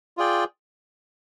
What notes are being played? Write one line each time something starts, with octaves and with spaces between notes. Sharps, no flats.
F4 G#4 D5 G5